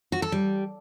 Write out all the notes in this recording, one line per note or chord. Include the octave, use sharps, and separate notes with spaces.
F#4
A4
G3